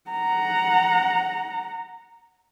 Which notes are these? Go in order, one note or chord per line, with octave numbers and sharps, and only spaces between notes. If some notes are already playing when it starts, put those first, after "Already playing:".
F#5 A#5